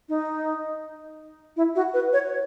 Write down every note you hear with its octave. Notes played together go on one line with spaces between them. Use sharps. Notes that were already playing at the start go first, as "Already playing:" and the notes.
D#4
E4
F#4
B4
C#5